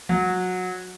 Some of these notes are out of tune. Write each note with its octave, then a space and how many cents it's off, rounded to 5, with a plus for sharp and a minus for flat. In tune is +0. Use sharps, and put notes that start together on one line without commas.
F#3 -20